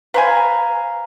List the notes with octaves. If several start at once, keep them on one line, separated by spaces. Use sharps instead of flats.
B4 C5 F5 G#5 A#5